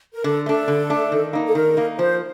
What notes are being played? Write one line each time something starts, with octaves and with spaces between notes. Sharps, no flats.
A#4
D3 A4
A3 D4 A4
D3
A3 D4
D#3
A#3 D#4
A4
D#3 A#4
A#3 D#4
F3 C5